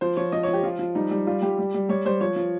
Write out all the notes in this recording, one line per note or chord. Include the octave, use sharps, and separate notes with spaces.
F3 C5
F3 C#5
F3 D#5
C#5
F3
G4
F3 F4
F3
G3 D#4
G3
G3 F4
G3 G4
G3
G3
G3 C#5
G3 C5
F3 C#5
F3